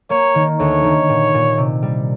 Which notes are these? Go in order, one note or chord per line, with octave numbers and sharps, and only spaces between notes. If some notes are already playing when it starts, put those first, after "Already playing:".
A#3 C#5
D#3
D2 C#5
D#3
A#2
A#2
C3
G3